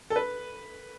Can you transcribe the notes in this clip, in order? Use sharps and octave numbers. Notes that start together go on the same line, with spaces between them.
A4
B4